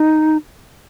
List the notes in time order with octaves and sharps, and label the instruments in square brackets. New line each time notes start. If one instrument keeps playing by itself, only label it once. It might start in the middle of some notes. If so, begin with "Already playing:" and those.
Already playing: [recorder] D#4